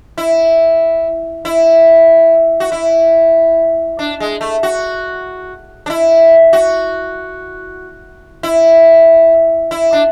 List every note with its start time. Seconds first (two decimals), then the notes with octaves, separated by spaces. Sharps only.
0.18 E4
1.45 E4
2.60 F#4
2.72 E4
3.99 D4
4.20 G#3
4.41 A3
4.63 F#4
5.86 D4
5.90 E4
6.53 F#4
8.43 E4
9.71 E4
9.93 D4